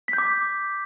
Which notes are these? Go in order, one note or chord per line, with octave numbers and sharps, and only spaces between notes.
B6
G6
D6